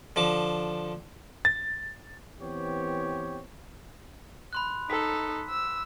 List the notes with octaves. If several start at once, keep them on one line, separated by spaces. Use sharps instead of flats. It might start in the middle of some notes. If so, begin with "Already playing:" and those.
D3 F3 D6
A6
E3 B3 C4 G4 C#5
B5 C6 F#6
D#4 A4 B6
E6